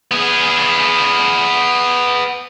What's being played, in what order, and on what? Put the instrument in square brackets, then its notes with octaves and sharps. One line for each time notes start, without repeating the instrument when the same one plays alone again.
[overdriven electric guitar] B3 G#4